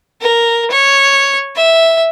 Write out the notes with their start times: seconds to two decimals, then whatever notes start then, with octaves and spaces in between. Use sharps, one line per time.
0.21 A#4
0.71 C#5
1.56 E5